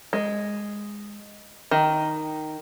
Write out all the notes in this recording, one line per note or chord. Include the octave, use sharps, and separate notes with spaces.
G#3
D#3